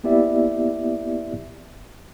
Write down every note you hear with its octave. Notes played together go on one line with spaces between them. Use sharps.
A#3 B3 E4 G4 D5 E5